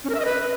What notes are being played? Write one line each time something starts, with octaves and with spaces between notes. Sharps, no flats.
C#4
A#4
E5
D#5
B4